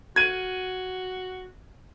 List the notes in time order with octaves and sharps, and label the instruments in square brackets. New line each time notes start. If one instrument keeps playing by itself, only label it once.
[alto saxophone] F#4 [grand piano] G#6 D#7